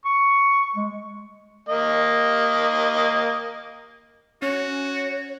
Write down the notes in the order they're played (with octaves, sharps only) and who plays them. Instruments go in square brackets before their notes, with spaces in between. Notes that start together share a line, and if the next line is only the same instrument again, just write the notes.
[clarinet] C#6
G#3
[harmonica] A#3 D#5
[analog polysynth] C#4 [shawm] F#4 [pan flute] C#5